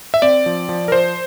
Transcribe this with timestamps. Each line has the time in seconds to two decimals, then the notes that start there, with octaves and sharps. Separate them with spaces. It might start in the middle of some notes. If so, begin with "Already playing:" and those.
0.14 E5
0.22 C4 D5
0.46 F3
0.69 F3
0.88 A#4
0.92 F3 C5